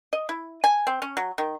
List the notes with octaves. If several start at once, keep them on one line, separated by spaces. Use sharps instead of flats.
D#5
E4
G#5
C4
C#4
F#3
D#3